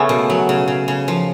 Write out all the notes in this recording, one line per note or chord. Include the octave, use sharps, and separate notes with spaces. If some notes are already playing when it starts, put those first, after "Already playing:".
Already playing: C#3 A3 B3 C#4
B2
F#3
C#3
C#3
C#3
F3